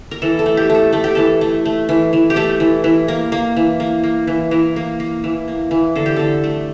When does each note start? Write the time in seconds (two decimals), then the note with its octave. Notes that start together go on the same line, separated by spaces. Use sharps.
0.11 A#4
0.22 E3 A4
0.39 A4
0.46 A3
0.57 G4
0.70 A3 A4
0.93 A3 A4
1.04 G4
1.15 E3 A4
1.41 A3
1.65 A3
1.89 E3
2.13 E3
2.30 G4
2.36 A3 A4
2.60 E3
2.84 E3
3.08 A#3 A#4
3.32 A#3
3.56 E3
3.80 A#3
4.04 A#3
4.27 E3
4.51 E3 A#4
4.76 A#3
5.00 A#3
5.24 E3
5.48 A#3
5.71 E3
5.96 D3 A4
6.06 G4
6.16 D3 A4
6.44 A3